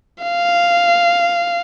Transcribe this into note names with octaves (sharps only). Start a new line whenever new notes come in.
F5